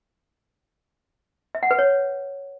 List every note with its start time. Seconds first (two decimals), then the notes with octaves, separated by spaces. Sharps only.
1.55 E5
1.63 F#5
1.71 B4
1.79 C#5